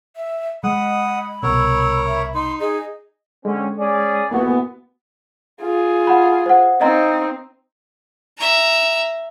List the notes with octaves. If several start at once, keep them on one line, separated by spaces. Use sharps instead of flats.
E5
G#3 D#5 F#5 B5 D#6
C2 B2 A#4 C#5 E6
E5
D#4 C6
D#4 G#4 D#5
D3 G#3 C4 C#4
C#4 G#4 D5
F2 C3 E3 A#3 B3 F#4
F4 G#4
F#5 B5
C5 F#5
C4 D#4 D#5 F5 A#5
E5 A#5